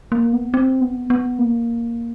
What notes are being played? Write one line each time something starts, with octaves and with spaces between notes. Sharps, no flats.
A#3
B3
C4
B3
B3
A#3